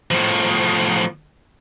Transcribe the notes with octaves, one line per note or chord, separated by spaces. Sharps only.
A2 F3